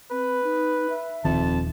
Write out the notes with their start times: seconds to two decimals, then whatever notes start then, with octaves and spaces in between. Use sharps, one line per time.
0.11 C4 B4
0.44 D#4
0.90 E5
1.25 D#1 B1 F2 D#3 A5